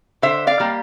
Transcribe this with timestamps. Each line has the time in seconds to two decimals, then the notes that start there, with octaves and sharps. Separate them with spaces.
0.22 D3 C5 E5
0.47 D5 F5
0.60 G3 A#3